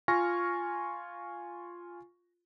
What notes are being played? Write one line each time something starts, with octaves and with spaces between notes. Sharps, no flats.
F4 G#5 C#6 F6 A#6